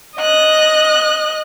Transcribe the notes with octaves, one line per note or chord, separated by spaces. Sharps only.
D#5 F#6